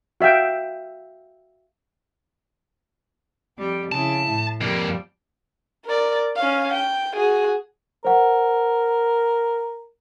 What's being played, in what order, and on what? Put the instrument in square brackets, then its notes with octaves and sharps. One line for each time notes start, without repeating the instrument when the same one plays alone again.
[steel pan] F#4 E5 F5 G5
[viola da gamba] F2 G3 G4
[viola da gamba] C#3 E4 [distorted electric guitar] A5
[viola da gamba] A2
[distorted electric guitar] F2 A#3 [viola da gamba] F3 G3
[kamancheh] A#4 D5
C#4 F5
G5
F#4 G#4
[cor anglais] A#4 [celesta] C5 F#5